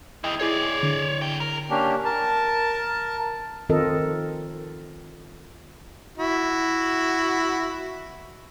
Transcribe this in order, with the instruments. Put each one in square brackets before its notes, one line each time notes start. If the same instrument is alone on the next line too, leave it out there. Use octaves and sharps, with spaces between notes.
[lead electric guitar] E4 G#4 [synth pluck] D#5 G5
[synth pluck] E4 G#4 C7 [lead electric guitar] C#5 D5
[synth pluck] D3
[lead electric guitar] F#2 G5
A#4
[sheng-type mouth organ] A#3 C#4 D4 G4
A#4 A5
[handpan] D#3 C4 F4 A4 A#4 D#5
[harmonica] E4 F#4